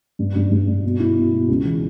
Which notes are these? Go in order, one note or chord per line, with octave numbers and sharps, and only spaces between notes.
G2
G2
G2
G2
B2
E4
B2
B2
C#2
E3